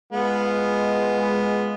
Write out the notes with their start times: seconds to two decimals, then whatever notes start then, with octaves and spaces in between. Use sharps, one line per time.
0.13 G#3 B3 F4